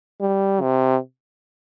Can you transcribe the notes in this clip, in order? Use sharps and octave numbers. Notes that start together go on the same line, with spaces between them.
G3
C3